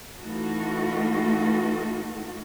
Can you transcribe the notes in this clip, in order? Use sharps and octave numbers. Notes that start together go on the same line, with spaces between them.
E3 A3 D#4 F4 F#4 A4